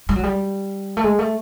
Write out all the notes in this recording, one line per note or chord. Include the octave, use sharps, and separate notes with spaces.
G3
F#3
G3
A3
G#3
A3